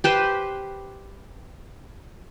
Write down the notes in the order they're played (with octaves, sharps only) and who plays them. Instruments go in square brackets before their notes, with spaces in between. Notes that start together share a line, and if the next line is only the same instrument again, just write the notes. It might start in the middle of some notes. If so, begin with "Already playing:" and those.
[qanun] G4 B4 C5